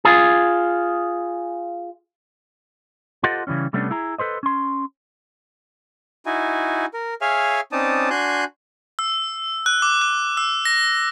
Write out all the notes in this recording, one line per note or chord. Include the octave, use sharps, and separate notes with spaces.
F4 G#4
F4 G4 A4 C5 D#5 F#5
C#3 E3 G3 C#4
C3 G3 A3 B3 C#4 D4
E4 G#4 A#5
A4 B4 C5 D#5
C#4 C6
D#4 E4 F#4 G#5
A#4
G#4 C#5 E5 F5 G#5 F6
C4 C#4 D#4 D5 A5 D#6
D4 F#4 G#5 C6 F#6 G6
E6
F#6
D6
F#6
E6
A#6